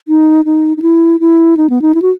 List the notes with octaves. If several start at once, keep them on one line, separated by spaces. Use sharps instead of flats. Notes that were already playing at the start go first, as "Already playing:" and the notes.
D#4
D#4
D#4
E4
E4
D#4
B3
D#4
E4
F#4